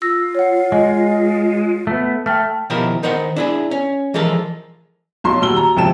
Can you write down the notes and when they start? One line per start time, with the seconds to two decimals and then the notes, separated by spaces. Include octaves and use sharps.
0.02 F4 E6 A#6
0.35 C#5 F#5
0.72 G#3 D#5
1.87 A3 B3
2.26 A3 G5 A5 F6
2.70 B2 D#3 F3 E4 G4 A#4
3.03 D#3 D#4 A#4 C5 F#5
3.36 D4 E4 G#4
3.71 C#4
4.14 E3 F3 G#3 A4 A#4
5.24 B1 F#3 C6
5.41 D#1 F#4 E6 G7
5.56 A#5
5.76 G#1 F2 C3 G5 A5 E7